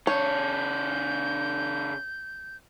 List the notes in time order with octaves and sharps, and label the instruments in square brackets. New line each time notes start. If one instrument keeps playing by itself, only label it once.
[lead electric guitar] C#3 A4 [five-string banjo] C#5 [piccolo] G6